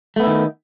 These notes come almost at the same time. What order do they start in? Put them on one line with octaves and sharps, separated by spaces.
A3 B3 E4 D#3